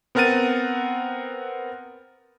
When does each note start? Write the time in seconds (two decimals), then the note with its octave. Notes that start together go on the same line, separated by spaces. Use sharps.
0.15 B3 C4 A#4 F#5 A6 D#7